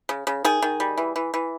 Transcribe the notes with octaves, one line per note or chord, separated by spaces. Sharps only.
C#3
C#3
D#3 G#4
D#3
G3
E3
E3
E3